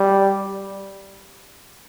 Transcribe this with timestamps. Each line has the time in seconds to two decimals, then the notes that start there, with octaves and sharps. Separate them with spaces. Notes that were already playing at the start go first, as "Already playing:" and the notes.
Already playing: G3